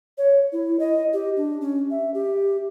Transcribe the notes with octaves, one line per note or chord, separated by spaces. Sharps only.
C#5
E4
D#5
G4
D4
C#4
E5
G4